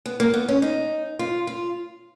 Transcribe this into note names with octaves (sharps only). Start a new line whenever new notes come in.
B3
A#3
B3
C#4
D#4
F4
F4